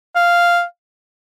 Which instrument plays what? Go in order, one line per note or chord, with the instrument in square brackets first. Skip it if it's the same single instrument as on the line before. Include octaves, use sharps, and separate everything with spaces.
[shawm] F5